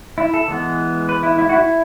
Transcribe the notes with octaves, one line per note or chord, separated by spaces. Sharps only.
E4
A4
E3 G#3 B3
B4
E4
E4
F#4
E4